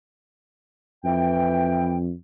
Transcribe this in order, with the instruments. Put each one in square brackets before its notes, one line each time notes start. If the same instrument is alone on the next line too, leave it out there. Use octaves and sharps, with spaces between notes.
[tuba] F2 [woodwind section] E3 G5